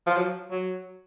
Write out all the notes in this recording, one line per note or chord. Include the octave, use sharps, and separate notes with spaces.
F3
F#3
F#3